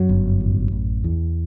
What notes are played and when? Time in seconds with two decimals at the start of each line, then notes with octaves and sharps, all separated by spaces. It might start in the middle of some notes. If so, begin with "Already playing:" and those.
Already playing: F#2 F#3
0.09 G1
0.41 A1
0.72 A1
1.04 E2